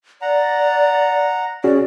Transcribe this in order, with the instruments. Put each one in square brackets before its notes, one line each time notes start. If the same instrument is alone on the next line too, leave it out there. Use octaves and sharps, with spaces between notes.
[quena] D5 [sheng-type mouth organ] F#5 A#5
[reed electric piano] C#4 F#4 G#4 [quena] D5